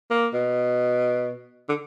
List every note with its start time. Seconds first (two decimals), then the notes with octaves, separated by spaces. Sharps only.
0.10 A#3
0.33 B2
1.69 D3